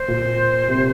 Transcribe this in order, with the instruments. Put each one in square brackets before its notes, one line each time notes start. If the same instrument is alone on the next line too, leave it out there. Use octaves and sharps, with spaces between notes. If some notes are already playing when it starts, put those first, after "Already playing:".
Already playing: [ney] C5
[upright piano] A#2
C3